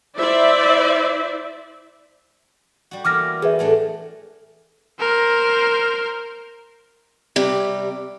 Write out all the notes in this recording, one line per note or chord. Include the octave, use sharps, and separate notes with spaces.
E4 C5 D5 E5
G3 F#4
E3 A#3 B3 D6 F6 A#6
E2 G#4 B4 E5
A2 A3 D4
A#4 C5
C3 G3